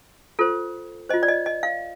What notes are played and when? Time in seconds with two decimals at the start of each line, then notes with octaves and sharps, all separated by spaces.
0.39 F4 A4 C5
1.09 F4 C5 D#5
1.23 D5
1.28 D#5
1.46 D#5
1.63 F5